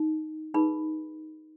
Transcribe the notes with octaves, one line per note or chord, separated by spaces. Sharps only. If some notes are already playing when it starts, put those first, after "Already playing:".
Already playing: D#4
D#4 G#4 B4 B5